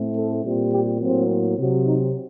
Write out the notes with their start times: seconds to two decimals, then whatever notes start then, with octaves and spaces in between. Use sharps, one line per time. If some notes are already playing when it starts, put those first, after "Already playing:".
Already playing: A2 A3 C4
0.15 A4
0.43 A#2 G3 C4
0.72 G4
1.01 A2 F#3 A#3 C4
1.58 C3 F#3 C4
1.86 D#4